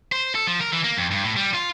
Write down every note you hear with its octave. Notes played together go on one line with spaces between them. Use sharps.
C5
A4
F3
A#4
E3
A#3
F2
G2
A2
G3
F4